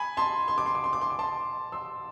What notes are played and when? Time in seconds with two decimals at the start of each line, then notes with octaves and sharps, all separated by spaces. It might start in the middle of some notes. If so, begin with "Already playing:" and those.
Already playing: G#5 B5
0.17 A5 C6
0.48 C6
0.58 D6
0.66 C6
0.75 D6
0.84 C6
0.93 D6
1.01 C6
1.10 D6
1.19 A5 C6
1.72 C6 E6